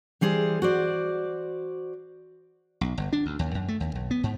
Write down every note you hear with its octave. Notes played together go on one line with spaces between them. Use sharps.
E3 G3 G#4 C5
F#4 C5 D5
B1
G1
D4
D2
D#2
F#2
A3
D#2
B1
B3
G#2